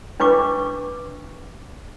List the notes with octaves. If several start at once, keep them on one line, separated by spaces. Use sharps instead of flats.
D4 B4 C#6 D6